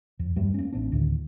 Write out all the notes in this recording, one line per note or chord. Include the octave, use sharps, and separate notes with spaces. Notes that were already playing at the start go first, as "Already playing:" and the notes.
F2
E2 G2 G3
A#3 C#4
A1 B3 C4 D4
D2 A2 D#3